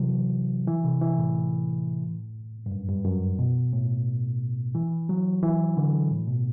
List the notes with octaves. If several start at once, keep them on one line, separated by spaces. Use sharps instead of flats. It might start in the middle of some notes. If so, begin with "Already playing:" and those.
Already playing: C3 E3 F#3
E3
C3
E3
A2
G2
F#2
G2
F#2
B2
A2
E3
F#3
E3
D3
A2
B2